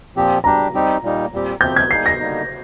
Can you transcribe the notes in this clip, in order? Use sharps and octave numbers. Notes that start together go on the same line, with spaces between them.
A#2 F3 C4 G4
G3 D4 G4 A#5
G3 C4 D#4 G4
A#2 G3 A#3 D#4
A#2 G3 C4 G4
C3 F3 C4 G4 G6
G#6
G3 A#3 D#4 G#4 C7
A#6
D3 G3 A#3 D#4